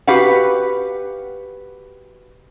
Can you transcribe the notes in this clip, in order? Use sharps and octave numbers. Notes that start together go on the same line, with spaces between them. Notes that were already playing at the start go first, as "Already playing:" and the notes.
F#4 G4 B4 F5 F#5